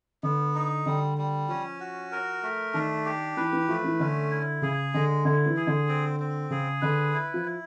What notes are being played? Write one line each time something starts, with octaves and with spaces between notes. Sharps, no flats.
D3 B3
D#4
D3 G3
G3
F3 C#4
F#4
A#4
A3
D#3 D4
G4
E3 B4
E3
F3 A3
E3
D3 C#4
E4
C#3 G#4
D3 G#3
D3 E4
E3
G#4
D3
C4
C4
C#3 G#4
D3 B4
E4
F3
E4